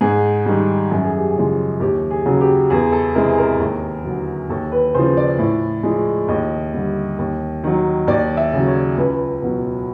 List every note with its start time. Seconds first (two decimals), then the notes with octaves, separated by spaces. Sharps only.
0.01 G#2 G#4
0.46 D#3 G3
0.91 F#2 A4
1.04 G#4
1.17 G4
1.30 G#4
1.36 C#3 F3 G#3
1.80 D#2 G4
2.10 G#4
2.26 C#3 F#3
2.41 G4
2.70 E2 G#4
2.92 A4
3.14 C3 E3 G#3 A#4
3.38 A#4
3.59 D#2
4.04 D3 F#3
4.49 D#2 A4
4.72 B4
4.94 C#3 F3 C5
5.17 D5
5.39 A2
5.83 F3 G#3
6.28 D#2 D#5
6.74 D3 G3
7.19 D#2
7.64 D#3 F#3
8.07 D#2 D5
8.37 E5
8.53 C#3 F#3
8.67 C#5
8.97 C#2 B4
9.42 B2 F#3